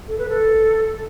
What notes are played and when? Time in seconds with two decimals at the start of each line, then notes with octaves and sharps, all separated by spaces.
0.08 A4
0.18 B4
0.29 A4